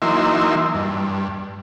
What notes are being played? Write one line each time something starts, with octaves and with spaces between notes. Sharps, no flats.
E3 F#3 A#3 D#4 E5 C6
G2